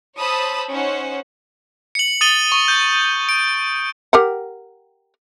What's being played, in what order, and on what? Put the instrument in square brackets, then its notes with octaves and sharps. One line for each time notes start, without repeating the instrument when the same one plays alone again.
[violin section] C5 C#5 A5 B5 D#6 E6
C#4 D#4 C5 F#5
[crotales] C#7 F#7
D#6 A6 D#7 F#7 G7
C#6
G6
D7
[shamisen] G4 A#4 F#5